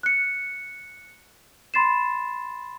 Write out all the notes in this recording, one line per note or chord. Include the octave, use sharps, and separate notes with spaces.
F#6 C#7
B5 C6 A6 C7 E7